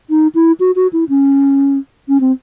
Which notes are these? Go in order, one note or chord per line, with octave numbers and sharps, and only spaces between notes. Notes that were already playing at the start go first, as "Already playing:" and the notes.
D#4
E4
F#4
F#4
E4
C#4
C#4
C4